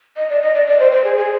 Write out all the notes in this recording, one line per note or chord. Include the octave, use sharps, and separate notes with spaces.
D#5
D5
D#5
D5
D5
C5
C5
G#4
G#4